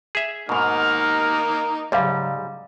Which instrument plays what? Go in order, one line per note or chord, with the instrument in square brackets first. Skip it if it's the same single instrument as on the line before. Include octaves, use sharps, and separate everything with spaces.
[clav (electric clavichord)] G#4 E5
[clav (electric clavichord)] G#2 B2 [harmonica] A#3 D#4 A#4 [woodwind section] F6
[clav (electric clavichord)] G#2 G3 [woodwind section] C#3 F#3 [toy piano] D5 F5